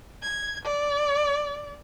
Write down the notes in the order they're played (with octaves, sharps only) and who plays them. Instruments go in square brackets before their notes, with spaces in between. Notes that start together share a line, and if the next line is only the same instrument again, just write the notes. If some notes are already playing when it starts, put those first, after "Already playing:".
[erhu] G#6
D5